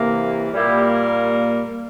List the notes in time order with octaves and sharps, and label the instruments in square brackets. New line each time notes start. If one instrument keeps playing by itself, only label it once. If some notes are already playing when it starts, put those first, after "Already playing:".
Already playing: [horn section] C3 E3 A#3
A#2 G3 A#3 E4 G4